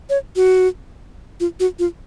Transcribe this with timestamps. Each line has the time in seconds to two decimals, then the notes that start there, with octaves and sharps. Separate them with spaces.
0.10 C#5
0.36 F#4
1.40 F4
1.60 F#4
1.79 F4